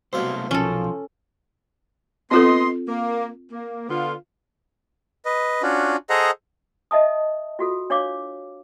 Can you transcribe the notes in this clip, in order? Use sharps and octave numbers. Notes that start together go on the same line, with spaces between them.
C2 B2 F#3 A3 C5 F5
B1 F3 C#4 A4
B3 C4 F4 A4 D#5 C6
A#3
A#3
D3 B3 F4
B4 D#5
C#4 D4 F4 F#4
G#4 A4 C5 D#5 F#5 A#5
D#5 E5 A5 D#6
F4 F#4 A4
D4 C#5 F5 D6